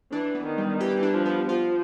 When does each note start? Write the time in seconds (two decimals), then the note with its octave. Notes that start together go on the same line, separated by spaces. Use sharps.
0.12 E3 D4
0.35 B3
0.46 D#3
0.58 G3
0.80 E3 G4
1.03 D4
1.14 F3
1.25 B3
1.49 F3 F4